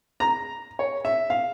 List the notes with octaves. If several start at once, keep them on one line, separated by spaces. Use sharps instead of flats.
A#5
C#5
E5
F5